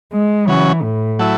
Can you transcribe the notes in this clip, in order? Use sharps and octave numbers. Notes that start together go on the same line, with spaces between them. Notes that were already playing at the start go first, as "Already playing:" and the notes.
G#3
C#3 E3 F#3 C#4
A2
F#3 A3 E4